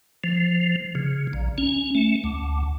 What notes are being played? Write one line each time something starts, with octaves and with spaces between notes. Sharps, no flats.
F3
C#3
A#1
C#4
A3
D2